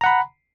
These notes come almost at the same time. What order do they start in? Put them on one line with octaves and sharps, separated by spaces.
A#5 F#5 B5